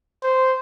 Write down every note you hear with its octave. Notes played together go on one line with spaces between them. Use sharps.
C5